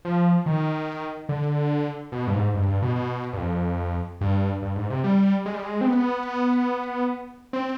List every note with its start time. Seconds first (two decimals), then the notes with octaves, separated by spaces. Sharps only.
0.05 F3
0.46 D#3
1.29 D3
2.12 B2
2.27 G2
2.34 G#2
2.54 G2
2.68 G2
2.82 B2
2.96 B2
3.33 G2
3.37 F2
4.21 G2
4.62 G2
4.76 G#2
4.90 C3
5.04 G3
5.46 G#3
5.54 G3
5.63 G#3
5.81 C4
5.87 B3
7.53 C4